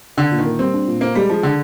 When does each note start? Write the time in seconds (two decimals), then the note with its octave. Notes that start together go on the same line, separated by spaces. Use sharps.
0.17 D3 D4
0.31 A#2
0.38 D#3
0.45 A#3
0.59 G3 C4
0.73 D4
0.87 A#2
1.01 A#3 C5
1.15 G3 G#3
1.29 F3 G#4
1.43 D3 D4